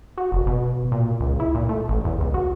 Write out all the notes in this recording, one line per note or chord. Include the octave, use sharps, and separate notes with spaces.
F#4
F1
B2
A#2
C#2
E4
A#2
A3
A1
E2
C#2
F#4